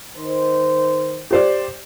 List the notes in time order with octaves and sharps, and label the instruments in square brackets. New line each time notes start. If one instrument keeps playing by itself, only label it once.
[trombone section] D#3 C5
[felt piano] G4 C5 D5